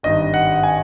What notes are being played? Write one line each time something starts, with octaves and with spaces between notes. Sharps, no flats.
G#1 G2 D#3 G3 D#5
F#5
G#5